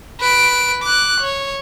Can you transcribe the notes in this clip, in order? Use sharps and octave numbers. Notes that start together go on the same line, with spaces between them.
B4 D7
D6 F#6
C#5